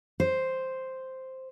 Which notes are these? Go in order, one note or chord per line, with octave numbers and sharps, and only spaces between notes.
C5